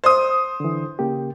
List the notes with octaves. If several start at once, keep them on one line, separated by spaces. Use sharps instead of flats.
C5 D#6
D3 E3
C#3 A#3 G4